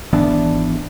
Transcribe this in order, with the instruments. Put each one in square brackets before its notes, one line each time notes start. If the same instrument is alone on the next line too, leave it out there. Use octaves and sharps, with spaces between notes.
[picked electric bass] G#1 E3 B3 [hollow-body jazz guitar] D4